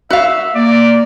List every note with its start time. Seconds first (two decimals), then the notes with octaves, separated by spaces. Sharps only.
0.10 F#4 E5 F5
0.55 A#3 D5